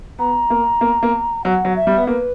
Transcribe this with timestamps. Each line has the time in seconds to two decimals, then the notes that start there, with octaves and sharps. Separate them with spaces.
0.19 B3 A#5
0.50 A#3
0.81 A#3
1.03 A#3
1.45 F#3 F#5
1.65 F#3
1.76 E5
1.87 G3
1.97 B3
2.07 A#3 B4